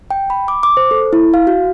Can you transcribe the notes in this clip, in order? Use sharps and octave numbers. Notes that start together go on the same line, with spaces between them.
G5
B5
D6
D6
C5
A4
E4
F5
F#4